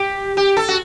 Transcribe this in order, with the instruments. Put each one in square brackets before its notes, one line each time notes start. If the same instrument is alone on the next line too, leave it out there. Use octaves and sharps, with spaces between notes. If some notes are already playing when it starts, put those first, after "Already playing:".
Already playing: [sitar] G4
G4
A4
F#4